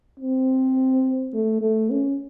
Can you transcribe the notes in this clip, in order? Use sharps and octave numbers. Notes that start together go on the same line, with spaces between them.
C4
A3
A3
C#4